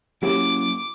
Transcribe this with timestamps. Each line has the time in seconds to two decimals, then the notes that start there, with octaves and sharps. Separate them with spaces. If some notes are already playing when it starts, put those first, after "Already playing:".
0.23 F#3 A#3 C#4 E4 F#4 G4 C#5 D6